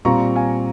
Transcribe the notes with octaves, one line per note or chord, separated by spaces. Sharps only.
A#2 G3 C4 F4 A#5 C#6
F5 G#5